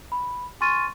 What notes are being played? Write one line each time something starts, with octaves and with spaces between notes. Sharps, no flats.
B5
G#5 C6 C#6 F6 A6 D#7